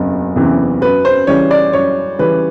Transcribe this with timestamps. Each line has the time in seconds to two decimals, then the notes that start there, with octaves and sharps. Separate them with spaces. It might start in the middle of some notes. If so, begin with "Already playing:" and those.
Already playing: F#1 E2 C3
0.36 E2 C3 E3
0.81 F#2 B4
1.05 C5
1.27 C#3 E3 G3 C#5
1.51 D5
1.73 F#2 C#5
2.19 C#3 E3 G3 B4